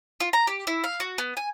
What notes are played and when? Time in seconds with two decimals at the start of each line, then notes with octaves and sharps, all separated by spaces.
0.20 F4
0.33 A#5
0.47 G4
0.67 E4
0.84 F5
1.00 F#4
1.18 B3
1.37 G#5